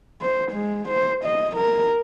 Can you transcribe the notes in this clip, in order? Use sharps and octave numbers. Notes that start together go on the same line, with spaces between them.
C5
G#3
C5
D#5
A#4